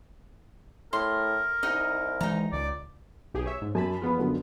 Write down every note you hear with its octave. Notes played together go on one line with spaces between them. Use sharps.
A2 A#4 C6
C2 D#4 D#5
E3 G#3 D#4 A#5
C#2 D5
B1 G4 G#4
C#5 E5
G#2
F#2 G#5 A5 B5
E2 F3 B3 F4 B5
F#2 D3